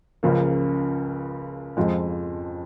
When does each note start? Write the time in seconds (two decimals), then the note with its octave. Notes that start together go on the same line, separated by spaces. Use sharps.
0.23 C#2 C#3 F3 A#3
1.77 F2 F3 G#3